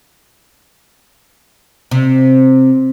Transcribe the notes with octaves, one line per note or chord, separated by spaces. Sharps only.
C3